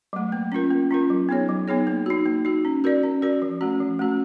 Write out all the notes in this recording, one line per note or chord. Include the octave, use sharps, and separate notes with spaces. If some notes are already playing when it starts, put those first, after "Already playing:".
F#3 A3
A#3
C#4 F4 A#4
A#3
C#4 F4 A#4
F#3
B3 D#4 G#4 C#5
F#3
B3 D#4 G#4 C#5
A#3
D#4 F#4
A#3
D#4 F#4
C#4
F#4 A#4 D5
C#4
F#4 A#4 D5
F3
A3 C#4 F#4
F3
A3 C#4 F#4